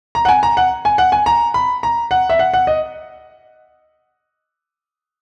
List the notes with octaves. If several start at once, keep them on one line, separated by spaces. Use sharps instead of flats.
A#5
F#5
G#5
A#5
F#5
G#5
F#5
G#5
A#5
B5
A#5
F#5
E5
F#5
F#5
D#5